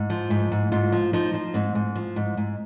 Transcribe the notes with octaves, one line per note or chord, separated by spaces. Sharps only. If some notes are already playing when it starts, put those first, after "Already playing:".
Already playing: G#2
F3
G#2
G#2
G#2 F4
F3
F3 D#4
F3
G#2 C4
G#2
F3
G#2
G#2